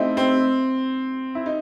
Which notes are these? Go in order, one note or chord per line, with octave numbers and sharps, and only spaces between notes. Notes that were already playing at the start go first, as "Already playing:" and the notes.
Already playing: A3 C4 D#4 E4
C4
E4
D#4